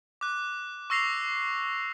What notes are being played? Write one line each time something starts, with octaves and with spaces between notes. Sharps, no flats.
D6 F#6
C#6 E6 A#6 C7 F7